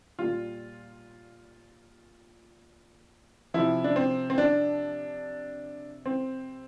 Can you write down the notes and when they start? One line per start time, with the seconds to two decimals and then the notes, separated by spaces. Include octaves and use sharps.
0.19 A#2 G3 F4
3.54 C3 F3 E4
3.84 D4
3.96 C4
4.30 C4
4.38 D4
6.06 C4